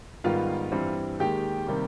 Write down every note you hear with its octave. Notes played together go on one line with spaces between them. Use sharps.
G#2 D#3 G3 B3 F4 F5
G2 E3 G3 C4
D#2 D#3 G#3 G4 G5
C3 D#3 G3 A#3